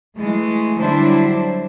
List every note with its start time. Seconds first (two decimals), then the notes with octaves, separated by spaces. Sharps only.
0.18 E3 G#3 A3
0.78 D3 F#3 G3 D4 E4 C5